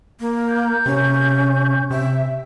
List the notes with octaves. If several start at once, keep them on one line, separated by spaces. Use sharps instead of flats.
A#3
G6
C3 C#4
C3 E5